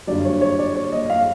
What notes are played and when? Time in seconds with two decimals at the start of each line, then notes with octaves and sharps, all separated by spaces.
0.07 G2 D3 F#3 D5
0.25 C#5
0.41 C#5
0.59 D5
0.75 C#5
0.92 D#5
1.10 F5